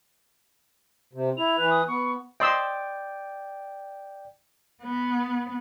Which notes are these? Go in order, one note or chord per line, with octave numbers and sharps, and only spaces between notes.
C3
E4 F7
E3 B4
D#6
B3 C#6
D5 D#5 G5 C6 E6
B3